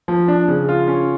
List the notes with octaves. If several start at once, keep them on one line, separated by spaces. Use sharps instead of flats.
F3
D4
C#3
F4
C#4